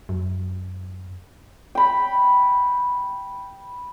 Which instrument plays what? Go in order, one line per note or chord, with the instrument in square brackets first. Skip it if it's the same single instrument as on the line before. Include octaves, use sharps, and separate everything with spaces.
[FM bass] F#2
[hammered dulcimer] G5 B5